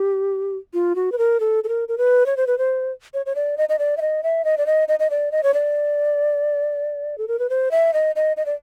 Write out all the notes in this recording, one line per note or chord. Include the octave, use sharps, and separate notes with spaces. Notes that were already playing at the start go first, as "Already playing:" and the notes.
Already playing: G4
F4
F#4
B4
A#4
A4
A4
A#4
A#4
B4
C#5
C5
B4
C5
C#5
C#5
D5
D#5
D#5
D5
E5
D#5
E5
D#5
D5
D#5
D#5
D#5
D5
D#5
C#5
D5
A4
A#4
B4
C5
E5
D#5
D#5
D#5
D5